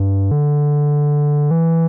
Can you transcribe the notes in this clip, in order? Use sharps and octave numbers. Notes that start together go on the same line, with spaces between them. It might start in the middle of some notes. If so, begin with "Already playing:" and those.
Already playing: G2
D3
E3